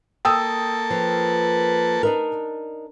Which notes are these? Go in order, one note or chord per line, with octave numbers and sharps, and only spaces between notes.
A#3 A4 G5 A5 D#6 E6
F3 B4
D4 D#4 A#4